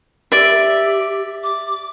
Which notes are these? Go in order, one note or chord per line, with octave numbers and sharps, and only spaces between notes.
G4 D5 E5
D6